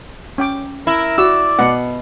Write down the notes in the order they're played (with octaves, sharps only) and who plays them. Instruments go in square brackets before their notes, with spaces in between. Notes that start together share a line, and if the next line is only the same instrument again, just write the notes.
[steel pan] C#4 G5 D6
[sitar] E4 [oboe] A#4
[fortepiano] F#4 [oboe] D5 [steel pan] E6
[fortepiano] B2 [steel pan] F#5